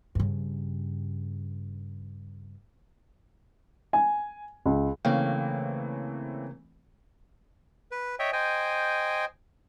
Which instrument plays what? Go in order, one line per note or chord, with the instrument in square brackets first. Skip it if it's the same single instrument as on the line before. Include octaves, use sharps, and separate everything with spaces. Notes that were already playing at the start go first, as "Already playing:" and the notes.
[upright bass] G2 C#3
[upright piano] G#5
C#2
[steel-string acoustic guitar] C#3 A#3 [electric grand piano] E3 A3 C4 [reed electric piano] C#5 F5 G5
[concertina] B4
C#5 D#5 E5 G5
C5 D#5 G5 G#5